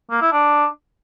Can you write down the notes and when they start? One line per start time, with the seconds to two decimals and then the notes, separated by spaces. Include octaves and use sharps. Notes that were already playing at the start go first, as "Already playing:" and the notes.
0.11 A#3
0.22 E4
0.32 D4